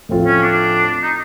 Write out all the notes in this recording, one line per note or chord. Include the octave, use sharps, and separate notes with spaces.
A2 F3 A3 C4 F4
C#4
D4
D#4